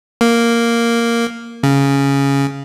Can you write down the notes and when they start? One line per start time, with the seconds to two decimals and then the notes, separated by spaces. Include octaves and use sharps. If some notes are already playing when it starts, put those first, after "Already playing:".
0.21 A#3
1.63 C#3